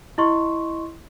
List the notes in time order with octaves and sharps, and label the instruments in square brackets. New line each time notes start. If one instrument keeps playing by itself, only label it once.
[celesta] E4 D#5 C6 C#6